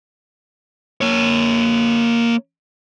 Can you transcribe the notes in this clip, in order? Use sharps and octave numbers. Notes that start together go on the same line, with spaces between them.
A#3 C#5